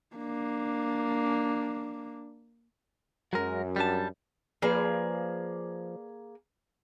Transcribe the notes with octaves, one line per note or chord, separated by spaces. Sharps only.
A#3 D4
F#2 F#3 G#3 A#4
G3 D4 A5
F3 A#3 G#4 B4 D5